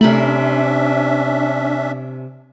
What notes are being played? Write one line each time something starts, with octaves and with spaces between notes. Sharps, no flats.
C3 A3 C#4 D4 A#4 E5 B5